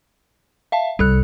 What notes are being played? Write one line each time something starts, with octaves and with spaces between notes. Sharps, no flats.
E5 F5 A5
C2 G3 A4 F#6